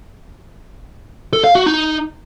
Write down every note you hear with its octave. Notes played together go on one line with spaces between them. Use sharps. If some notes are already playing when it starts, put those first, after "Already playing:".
A4
F5
F#4
D#4